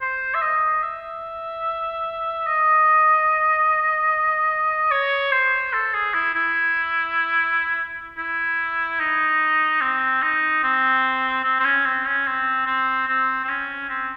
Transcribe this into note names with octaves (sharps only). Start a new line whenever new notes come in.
C5
E5
D#5
E5
D#5
C#5
C5
A4
G#4
E4
E4
E4
D#4
C4
D#4
C4
C4
C4
C#4
C4
C#4
C4
C4
C4
C4
C#4
C4